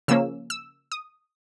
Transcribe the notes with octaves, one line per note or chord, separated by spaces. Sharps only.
C#3 F3 A#3 C#4 E6
E6
D#6